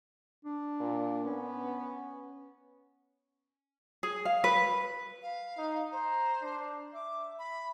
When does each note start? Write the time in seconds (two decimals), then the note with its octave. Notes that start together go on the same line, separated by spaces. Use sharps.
0.45 D4
0.80 A#2
1.26 B3 C#4
4.03 G#4
4.25 F5
4.44 B4
5.23 F5
5.58 D#4
5.92 C5 A#5
6.43 D4
6.94 E5 D6
7.39 B5